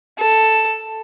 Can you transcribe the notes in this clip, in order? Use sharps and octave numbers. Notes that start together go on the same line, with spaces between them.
A4